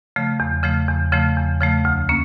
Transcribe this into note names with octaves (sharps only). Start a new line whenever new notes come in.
C#3 F3 A3
E2
C#3 F3 A3
E2
C#3 F3 A3
E2
C#3 F3 A3
D2
A#3 C#4